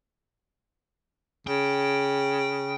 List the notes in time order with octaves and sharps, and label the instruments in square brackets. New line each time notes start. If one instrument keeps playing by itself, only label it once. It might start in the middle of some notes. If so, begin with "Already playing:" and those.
[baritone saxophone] C#3 [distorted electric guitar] G5